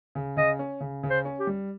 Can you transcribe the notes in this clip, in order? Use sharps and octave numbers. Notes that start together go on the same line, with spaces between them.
C#3
C#3 D#5
C#4
C#3
C#3
C5
C#4
G4
G3